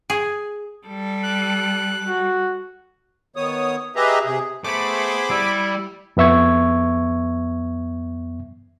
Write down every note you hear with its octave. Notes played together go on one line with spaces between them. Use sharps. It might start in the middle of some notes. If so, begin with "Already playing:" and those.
G#4
G3 A4
F#6
F#4
D#3 B3 C#5 D#6
G4 G#4 B4 D#5 E5 A#5
C3 G#4
A3 B3 G#4 C5 B5 D6
G3 E4
F2 B3 E5 C#6 G#6